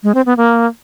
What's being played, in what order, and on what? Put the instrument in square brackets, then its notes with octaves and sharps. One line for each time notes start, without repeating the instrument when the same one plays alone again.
[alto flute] G#3
C4
B3
A#3